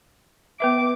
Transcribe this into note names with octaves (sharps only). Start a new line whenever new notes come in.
B3 B4 E5 D6